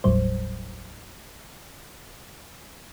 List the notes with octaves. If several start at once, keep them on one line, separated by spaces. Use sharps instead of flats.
G1 D#2 A2 F#3 G3 C5